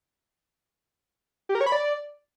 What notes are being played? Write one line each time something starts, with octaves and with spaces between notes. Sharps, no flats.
G4
A#4
C#5
B5
D5